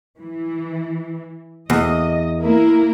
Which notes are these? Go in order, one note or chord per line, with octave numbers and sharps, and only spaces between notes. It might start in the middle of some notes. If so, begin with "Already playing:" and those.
E3
E2 D#5
A#3 E4 A#4